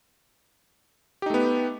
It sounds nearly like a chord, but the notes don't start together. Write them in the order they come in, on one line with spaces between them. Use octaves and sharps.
G4 D#4 A3 B3